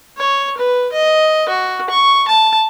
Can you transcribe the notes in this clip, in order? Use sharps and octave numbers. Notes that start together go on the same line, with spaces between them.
C#5
B4
D#5
F#4
C#6
A5